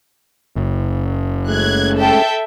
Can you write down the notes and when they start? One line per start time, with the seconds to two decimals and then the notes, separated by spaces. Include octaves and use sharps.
0.56 F#1
1.48 G#3 A3 C#4 F#6 G#6
1.96 A4 E5 G5